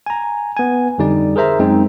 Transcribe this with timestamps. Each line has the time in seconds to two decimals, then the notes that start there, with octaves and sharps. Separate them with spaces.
0.06 G#5 A#5
0.57 B3 G#5
0.98 F2 D3 G3 D#4 D5
1.36 G#4 A#4 C5 E5 A#5
1.59 F#2 G#3 C4 D#4